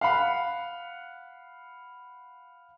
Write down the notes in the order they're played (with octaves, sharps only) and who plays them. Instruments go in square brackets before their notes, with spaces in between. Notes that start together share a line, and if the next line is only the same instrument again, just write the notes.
[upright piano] F5 F#5 B5